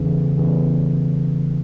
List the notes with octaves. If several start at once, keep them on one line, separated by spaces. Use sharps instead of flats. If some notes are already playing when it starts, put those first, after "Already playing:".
Already playing: E2 C#3 E3
E2 C#3 E3